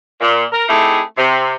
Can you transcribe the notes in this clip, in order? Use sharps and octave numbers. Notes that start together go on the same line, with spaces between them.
A#2
A#4
A3 C4 D#4 E4 G4 G#4
C3